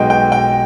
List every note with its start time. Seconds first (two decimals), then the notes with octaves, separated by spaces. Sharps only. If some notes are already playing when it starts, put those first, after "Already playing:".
Already playing: B1 B2 G#3 G5
0.10 G5
0.32 G5